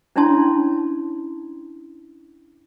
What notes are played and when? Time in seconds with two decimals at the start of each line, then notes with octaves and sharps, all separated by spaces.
0.16 C#4 D4 E4 C#5 A5 C6